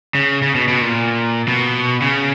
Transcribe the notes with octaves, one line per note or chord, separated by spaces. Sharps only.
C#3
C#3
B2
B2
A#2
B2
C#3